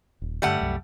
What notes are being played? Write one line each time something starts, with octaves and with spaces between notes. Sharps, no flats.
D#1
G2 D3 G3 A3 F#5
C2 F#2